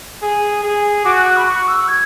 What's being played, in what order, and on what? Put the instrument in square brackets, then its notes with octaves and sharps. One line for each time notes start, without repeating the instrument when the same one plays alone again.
[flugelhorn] G#4
G#4
[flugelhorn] F#4 [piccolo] D6
[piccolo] F#6
F#6
B5
C#6
E6
G#6